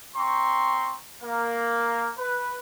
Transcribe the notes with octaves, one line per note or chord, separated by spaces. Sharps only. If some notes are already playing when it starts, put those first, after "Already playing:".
C4 A#5 C6 C#6
A#3
B4